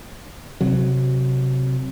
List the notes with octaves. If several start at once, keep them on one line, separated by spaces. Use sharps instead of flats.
C3 F#3